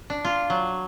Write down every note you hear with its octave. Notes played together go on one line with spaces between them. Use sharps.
D4
F4
F#3